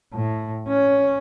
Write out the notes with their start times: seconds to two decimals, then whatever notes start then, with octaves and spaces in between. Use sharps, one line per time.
0.14 A2
0.68 C#4